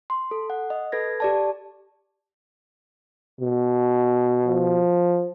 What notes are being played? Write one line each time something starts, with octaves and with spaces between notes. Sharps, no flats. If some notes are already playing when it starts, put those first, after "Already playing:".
C6
A4
F#5
D#5
A4 B4 G#6 A#6
G4 D5 A5
B2
F3